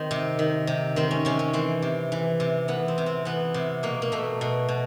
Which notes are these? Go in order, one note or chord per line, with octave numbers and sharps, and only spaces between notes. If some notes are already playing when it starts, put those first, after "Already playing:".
Already playing: D#3 C4
C3
D#3
C3
D#3 C4
C#4
C3 C#4
C#4
E3 C4
C3
E3
C3
E3 B3
C4
C3
C4
E3 B3
C3
B2 A#3
A#3
B2 A3
B2
B2